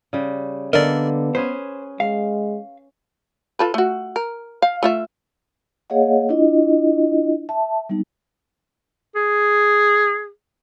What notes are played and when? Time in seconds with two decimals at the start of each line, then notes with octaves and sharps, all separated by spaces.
0.13 C#3 G3
0.73 D3 G3 A#3 B3 A4 A#4 D5 D#5
1.35 C#4 G#4 B4 C5
2.00 G#3 F5
3.59 F4 A4 B4
3.74 A3 F#4
4.16 A#4
4.62 F5
4.83 A3 F4 E5
5.90 A#3 G#4 C#5 D#5 F5 F#5
6.29 D4 E4 F4 D#5
7.49 E5 A5
7.89 G3 B3 D#4
9.15 G#4